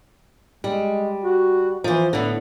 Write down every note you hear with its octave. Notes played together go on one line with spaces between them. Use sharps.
G3 G#3
F#4
E3 F3 C5
A2 D3 B3